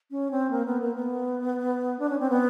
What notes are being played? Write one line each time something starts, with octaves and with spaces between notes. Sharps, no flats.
C#4
C4
A#3
B3
A#3
B3
D4
C#4
C4
B3